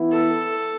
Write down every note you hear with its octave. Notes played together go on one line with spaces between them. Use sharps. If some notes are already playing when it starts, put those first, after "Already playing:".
Already playing: E3 B3 E4
A4